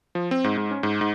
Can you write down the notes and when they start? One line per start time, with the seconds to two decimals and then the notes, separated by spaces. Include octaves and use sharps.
0.15 F3
0.31 C4
0.44 G#2
0.57 G#2
0.71 C#4
0.83 G#2
1.01 G#2